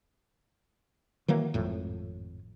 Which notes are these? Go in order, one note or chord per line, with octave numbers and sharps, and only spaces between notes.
D#3 E3 F#3 A#3
G#1 F2 A2